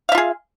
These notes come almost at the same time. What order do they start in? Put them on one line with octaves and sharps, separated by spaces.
F5 E5 F4 G#4